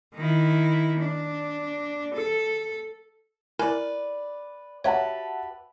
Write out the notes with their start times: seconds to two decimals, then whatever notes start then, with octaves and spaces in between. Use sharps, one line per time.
0.15 D#3 E4
0.99 D4
2.14 A4
3.59 E4 A#4 B4 D5 G#5
4.84 F#4 G4 B4 C#5 E5 F#5 A5